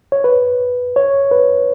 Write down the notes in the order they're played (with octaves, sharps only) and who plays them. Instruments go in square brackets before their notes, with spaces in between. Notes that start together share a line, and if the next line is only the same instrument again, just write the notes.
[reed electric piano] C#5
B4
C#5
B4